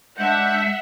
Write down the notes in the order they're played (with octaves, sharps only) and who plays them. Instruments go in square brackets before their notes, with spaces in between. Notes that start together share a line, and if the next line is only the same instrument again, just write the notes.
[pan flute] G#3 [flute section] D4 G6 [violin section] E5 F#5